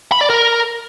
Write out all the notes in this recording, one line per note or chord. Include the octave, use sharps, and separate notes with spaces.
B5
D5
A#4